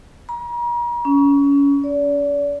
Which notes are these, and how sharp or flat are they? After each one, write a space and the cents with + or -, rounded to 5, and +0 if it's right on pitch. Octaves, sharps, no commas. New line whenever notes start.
A#5 +40
C#4 +25
D5 -35